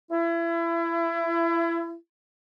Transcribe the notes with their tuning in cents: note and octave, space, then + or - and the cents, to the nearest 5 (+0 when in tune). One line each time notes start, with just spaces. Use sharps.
E4 +30